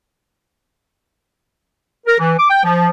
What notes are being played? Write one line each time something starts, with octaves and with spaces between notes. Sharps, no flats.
A#4
E3
D6
G5
F3